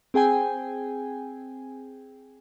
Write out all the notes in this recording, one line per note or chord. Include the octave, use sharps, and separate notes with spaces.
C4 G#4 G5 G#5